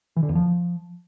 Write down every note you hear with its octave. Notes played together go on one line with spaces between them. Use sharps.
E3
D3
E2
F3